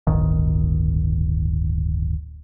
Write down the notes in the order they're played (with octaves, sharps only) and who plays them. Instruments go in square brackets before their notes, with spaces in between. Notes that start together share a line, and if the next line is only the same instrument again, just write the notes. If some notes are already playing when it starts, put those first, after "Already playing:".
[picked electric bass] D1 G1 D#3